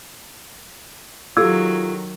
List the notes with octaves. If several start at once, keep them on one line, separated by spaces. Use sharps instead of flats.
D#3 F#3 F4 G4 A4 E6 G#6